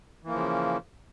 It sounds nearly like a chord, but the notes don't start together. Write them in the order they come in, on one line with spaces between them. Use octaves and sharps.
E3 A#3 F3 C#3